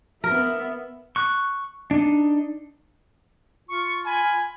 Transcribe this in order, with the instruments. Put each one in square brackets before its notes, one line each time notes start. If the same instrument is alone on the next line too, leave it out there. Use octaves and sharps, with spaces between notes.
[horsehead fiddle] B3 E5 [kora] A#4
[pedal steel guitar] C#6 F#6
D4 D#4
[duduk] F4 [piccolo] C#6
[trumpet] G#5 [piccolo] B5